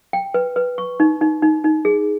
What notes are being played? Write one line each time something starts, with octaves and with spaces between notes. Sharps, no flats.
G5
B4
B4
C#6
D#4
D#4
D#4
D#4
G#4